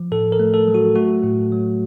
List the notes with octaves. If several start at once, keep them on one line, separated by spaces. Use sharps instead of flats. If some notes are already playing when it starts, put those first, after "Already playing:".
Already playing: F3
A2 A4
A#4
A3
A4
F#3
F#4
A3 F#4
A2
F#3